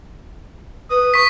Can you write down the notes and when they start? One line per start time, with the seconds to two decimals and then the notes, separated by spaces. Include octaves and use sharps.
0.91 B4 D#6
1.14 C#6 B6